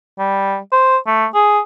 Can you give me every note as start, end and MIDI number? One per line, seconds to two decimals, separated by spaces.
0.19 0.58 55
0.72 0.97 72
1.07 1.26 57
1.34 1.60 68